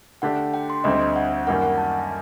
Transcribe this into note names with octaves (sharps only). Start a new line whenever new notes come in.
D3 A3 D4 G4 F#5
G5
C6
D2 D3 G3 C4 D#5
F#5
F#2 D#3 G3 A#3 F#5
F#5
A5